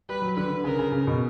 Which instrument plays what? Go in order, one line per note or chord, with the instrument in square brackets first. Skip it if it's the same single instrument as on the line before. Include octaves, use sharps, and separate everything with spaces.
[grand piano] G3 [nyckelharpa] B4
[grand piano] F#3
[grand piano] D3 [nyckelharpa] B4
[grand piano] D3
[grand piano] C#3 [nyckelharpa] A#4
[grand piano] C#3
C#3
B2